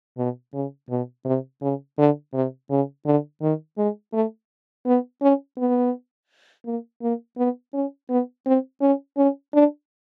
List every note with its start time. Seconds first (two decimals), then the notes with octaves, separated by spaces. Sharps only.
0.18 B2
0.54 C#3
0.90 B2
1.25 C3
1.62 C#3
1.98 D3
2.34 C3
2.70 C#3
3.06 D3
3.42 D#3
3.78 G#3
4.13 A3
4.86 B3
5.22 C#4
5.58 B3
6.66 A#3
7.02 A#3
7.38 B3
7.74 C#4
8.10 B3
8.46 C4
8.81 C#4
9.17 C#4
9.53 D4